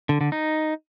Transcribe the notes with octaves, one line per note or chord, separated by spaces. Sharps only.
D3
D3
D#4